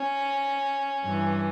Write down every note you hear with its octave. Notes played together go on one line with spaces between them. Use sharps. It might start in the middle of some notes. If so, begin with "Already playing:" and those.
Already playing: C#4
G2 E3